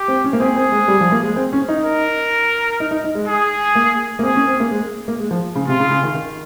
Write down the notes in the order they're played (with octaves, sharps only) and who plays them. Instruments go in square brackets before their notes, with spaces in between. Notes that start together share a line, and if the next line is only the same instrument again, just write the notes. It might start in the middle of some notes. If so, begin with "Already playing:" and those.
Already playing: [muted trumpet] G4
[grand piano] C4
C#4
A#3
[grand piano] C4 [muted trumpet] G#4
[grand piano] C4
G#3
G3
F3
A#3
G#3
C4
C#4
D#4
[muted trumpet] A#4
[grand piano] D#4
D#4
D#4
G#3
[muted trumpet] G#4
[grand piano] A#3
A#3
[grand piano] C4 [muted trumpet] G#4
[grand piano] C#4
C4
A#3
G#3
A#3
G#3
F3
C#3
[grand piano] C3 [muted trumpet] F4
[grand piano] C#3
C#3
D#3
D#3